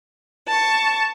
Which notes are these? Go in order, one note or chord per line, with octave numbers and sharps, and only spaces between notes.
A5 C#6